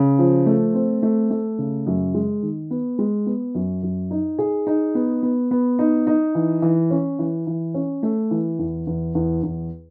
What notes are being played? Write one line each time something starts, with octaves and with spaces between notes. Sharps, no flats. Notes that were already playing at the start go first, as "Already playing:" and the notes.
Already playing: C#3
F3
A3
C4
A3
A3
C#3
F#2
G#3
D#3
B3
G#3
B3
F#2
F#2
D#4
G#4
D#4
B3
B3
B3
D#4
D#4
E3
E3
C#4
E3
E3
C#4
A3
E3
E2
E2
E2
E2